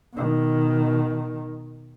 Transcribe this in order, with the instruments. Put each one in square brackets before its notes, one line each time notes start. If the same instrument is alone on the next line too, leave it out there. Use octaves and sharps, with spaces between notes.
[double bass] B2 D#3